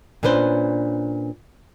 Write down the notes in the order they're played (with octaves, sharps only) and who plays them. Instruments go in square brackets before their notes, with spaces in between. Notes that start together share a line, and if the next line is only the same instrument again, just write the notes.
[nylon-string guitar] A#2 C#4 D4 B4 C5